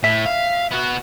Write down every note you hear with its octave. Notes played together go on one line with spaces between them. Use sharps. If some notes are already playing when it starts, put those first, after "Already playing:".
A2 E5
F5
B3 F#4